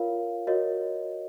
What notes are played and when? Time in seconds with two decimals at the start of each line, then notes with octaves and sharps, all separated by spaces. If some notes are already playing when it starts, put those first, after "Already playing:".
Already playing: F4 A#4 C#5 F5
0.47 F#4 A#4 C#5 D#5